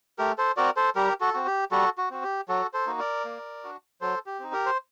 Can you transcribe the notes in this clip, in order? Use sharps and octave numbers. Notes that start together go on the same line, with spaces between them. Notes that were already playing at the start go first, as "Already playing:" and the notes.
A3 G4 A#4
A4 C5
C4 F#4 A#4 D5
A4 C5
G3 G4 A#4
F#4 A4
C4 F#4
G4
G3 F#4 A4
F#4
C4 F#4
G4
F#3 F#4 A4
A4 C5
A#3 D#4 F#4
A#4 D5
A#3
D4 F#4
F#3 A4 C5
G4
C4 D#4
G4 A#4
C5